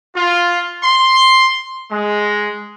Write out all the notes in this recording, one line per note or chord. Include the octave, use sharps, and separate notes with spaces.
F4
C6
G#3